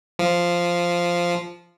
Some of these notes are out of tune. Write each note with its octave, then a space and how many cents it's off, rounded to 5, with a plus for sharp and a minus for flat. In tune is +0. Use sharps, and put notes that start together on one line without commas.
F3 -5